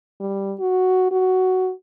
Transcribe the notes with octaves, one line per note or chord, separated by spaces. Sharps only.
G3
F#4
F#4